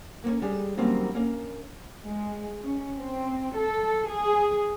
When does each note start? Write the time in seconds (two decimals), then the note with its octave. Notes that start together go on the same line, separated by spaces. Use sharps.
0.24 A#3 B3 C#4
0.42 G3 G#3 G#4
0.77 D#3 F#3 G3 A#3 C4 C#4
1.15 A#3 C#4
2.08 G#3
2.63 C#4
2.97 C4
3.57 A4
4.09 G#4